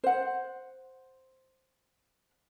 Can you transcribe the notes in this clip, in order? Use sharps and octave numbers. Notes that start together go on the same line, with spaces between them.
C5 F#5